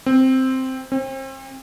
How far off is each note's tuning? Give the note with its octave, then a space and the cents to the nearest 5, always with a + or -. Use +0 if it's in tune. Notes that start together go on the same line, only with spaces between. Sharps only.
C4 +0
C4 +35